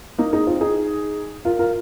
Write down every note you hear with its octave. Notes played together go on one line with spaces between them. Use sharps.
A#3 D#4
D#4 G#4
C4 F4
D#4 G#4
F4 A#4
F4 A#4